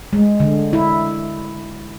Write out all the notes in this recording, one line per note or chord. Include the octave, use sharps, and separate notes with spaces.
G#3
D3
E4